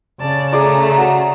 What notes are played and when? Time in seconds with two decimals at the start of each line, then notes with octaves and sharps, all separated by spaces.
0.21 C#3 D5 A5
0.53 A3 G#4 D5 A#5
0.98 F#4